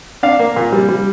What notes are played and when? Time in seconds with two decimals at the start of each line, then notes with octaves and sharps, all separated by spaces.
0.23 D4 F5
0.39 A#3
0.56 A#2
0.72 G3
0.89 G3